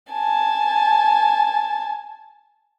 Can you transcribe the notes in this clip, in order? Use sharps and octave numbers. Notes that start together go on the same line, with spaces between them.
G#5 A5